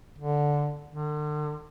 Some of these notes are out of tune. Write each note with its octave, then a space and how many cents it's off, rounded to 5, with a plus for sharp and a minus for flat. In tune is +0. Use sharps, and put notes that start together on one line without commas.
D3 -5
D3 +40